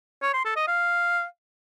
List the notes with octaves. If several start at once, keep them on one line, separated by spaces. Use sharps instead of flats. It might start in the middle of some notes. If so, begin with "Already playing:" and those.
C#5
C6
A4
D#5
F5